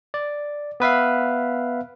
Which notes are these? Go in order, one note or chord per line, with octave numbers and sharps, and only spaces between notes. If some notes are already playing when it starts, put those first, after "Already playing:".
D5
B3 B4 E5 F5